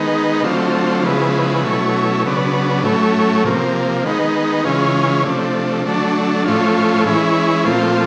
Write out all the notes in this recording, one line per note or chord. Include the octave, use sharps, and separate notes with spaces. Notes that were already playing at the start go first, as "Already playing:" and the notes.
Already playing: D#3 G#3 B3 D#4
D3 F#3 A3 C4 F4
C#3 F3 G#3 B3 E4
B2 F#3 A3 C#4 E4
C#3 F#3 B3 D4
A2 F#3 A3 C#4
C3 F3 A#3
D#3 G#3 B3 D#4
C#3 E3 G#3 C#4 F4
C3 F3 A3 D4
D3 F#3 A3 D4
A2 F3 A3 C#4 F4
E3 G#3 C#4 E4
A#2 F3 A3 C4 F4